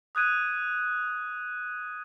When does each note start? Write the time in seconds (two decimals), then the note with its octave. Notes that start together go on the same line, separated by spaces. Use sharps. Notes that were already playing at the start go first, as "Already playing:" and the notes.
0.15 D#6 F#6 G#6 D#7